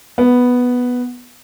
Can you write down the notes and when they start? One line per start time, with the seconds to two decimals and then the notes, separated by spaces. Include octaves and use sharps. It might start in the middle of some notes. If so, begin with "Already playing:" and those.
0.18 B3